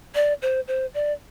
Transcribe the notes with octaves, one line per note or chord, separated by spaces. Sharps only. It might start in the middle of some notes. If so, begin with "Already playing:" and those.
D5
C5
C5
D5